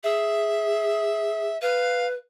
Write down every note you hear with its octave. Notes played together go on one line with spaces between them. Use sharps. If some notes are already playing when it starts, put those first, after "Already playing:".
G#4 E5
B4 F5